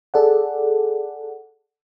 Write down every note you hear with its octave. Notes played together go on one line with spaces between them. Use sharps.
G#4 A4 D5 F#5